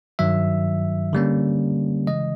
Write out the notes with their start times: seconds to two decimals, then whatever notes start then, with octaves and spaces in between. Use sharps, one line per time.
0.19 G2 D#3 F#3 E5
1.13 D3 G3 A#3 C#4
2.07 C#3 E3 G#3 D#5